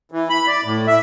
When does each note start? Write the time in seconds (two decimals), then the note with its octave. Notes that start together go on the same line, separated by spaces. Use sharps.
0.12 E3
0.30 B5
0.47 D5
0.64 A2
0.87 E5